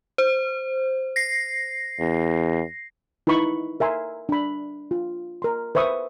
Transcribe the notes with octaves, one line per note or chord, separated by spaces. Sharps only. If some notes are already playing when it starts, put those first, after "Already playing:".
C5
A#6 C7
E2
D#4 E4 B4 B5 C#6
A#4 E5 G#5 C6
D4 B5
F4
A#4 C6
B4 C5 E5 C#6 D#6